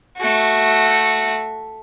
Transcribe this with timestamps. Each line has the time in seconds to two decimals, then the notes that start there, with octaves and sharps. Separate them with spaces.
0.17 A3 F#4